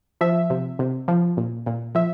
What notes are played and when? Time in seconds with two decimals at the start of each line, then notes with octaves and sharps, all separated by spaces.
0.21 F3 E5
0.50 C3
0.79 C3
1.08 F3
1.37 A#2
1.66 A#2
1.95 F3 E5